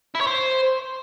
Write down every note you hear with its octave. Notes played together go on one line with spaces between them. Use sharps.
E4
C#5
C5